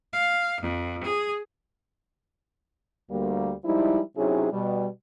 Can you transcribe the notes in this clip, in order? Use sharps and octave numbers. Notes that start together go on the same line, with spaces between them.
F5
F2
G#4
D2 G3 A#3
F3 G3 G#3 D#4 E4
C3 F#3 C#4 D#4 E4 G#4
B2 G3